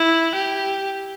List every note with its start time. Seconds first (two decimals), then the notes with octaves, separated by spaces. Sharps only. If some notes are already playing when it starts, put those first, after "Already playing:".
Already playing: E4
0.35 G4